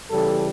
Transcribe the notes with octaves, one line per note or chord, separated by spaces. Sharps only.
C#3 E3 G3 A4